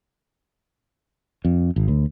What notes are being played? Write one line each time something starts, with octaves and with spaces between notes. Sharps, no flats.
F2
G#1
D2